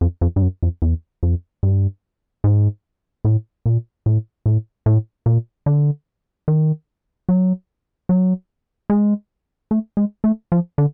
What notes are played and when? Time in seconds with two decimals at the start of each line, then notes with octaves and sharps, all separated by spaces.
0.01 F2
0.21 F2
0.36 G2
0.42 F#2
0.63 F2
0.82 E2
1.23 F2
1.63 G2
2.44 G#2
3.25 A2
3.66 A#2
4.06 A2
4.46 A2
4.86 A2
5.26 A#2
5.66 D3
6.48 D#3
7.29 F#3
8.09 F#3
8.90 G#3
9.71 A3
9.97 G#3
10.24 A3
10.52 F3
10.78 D3